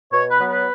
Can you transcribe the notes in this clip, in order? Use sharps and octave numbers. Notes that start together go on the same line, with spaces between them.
B2 C#5
B4
F#3 B3
B4